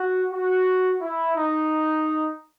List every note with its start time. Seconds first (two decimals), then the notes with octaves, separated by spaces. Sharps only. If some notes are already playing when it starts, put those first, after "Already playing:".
Already playing: F#4
0.32 F#4
1.01 E4
1.36 D#4